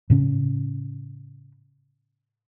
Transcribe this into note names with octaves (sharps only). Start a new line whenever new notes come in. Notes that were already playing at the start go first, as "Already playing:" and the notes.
A2 C#3 C#4